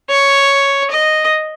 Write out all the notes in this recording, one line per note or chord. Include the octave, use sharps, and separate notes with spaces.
C#5
D#5